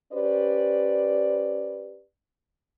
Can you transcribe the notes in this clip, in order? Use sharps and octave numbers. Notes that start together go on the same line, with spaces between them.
C#4 G4 B4 C5 D5